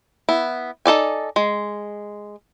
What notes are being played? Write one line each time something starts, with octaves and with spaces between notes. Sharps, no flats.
B3 E4
D#4 A4 D5 G#5
G#3